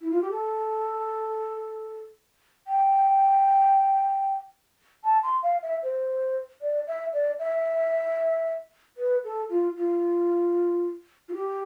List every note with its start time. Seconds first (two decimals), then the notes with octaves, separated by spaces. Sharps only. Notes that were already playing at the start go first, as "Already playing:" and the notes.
0.01 E4
0.11 F4
0.21 G4
0.31 A4
2.67 G5
5.04 A5
5.23 C6
5.43 F5
5.63 E5
5.83 C5
6.62 D5
6.87 E5
7.13 D5
7.39 E5
8.97 B4
9.24 A4
9.49 F4
9.77 F4
11.29 F4
11.34 G4